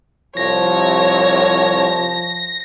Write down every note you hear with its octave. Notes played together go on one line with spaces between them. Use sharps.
C2 F3 C#5 A#6